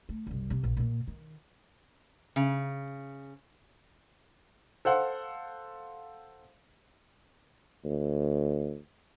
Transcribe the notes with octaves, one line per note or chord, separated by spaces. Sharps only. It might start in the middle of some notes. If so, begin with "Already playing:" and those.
A3
F#1 C2
C3
A#1
A#2 A#3
D#3
C#3
A4 C5 F5 F#5
D2